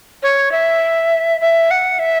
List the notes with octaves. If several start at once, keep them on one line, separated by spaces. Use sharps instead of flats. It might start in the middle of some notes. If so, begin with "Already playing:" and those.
C#5
E5
E5
F#5
E5